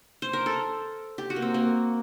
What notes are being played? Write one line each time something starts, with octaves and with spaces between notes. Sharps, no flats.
C5
A#4
A4
G4
F#4
A#3
C4
A#3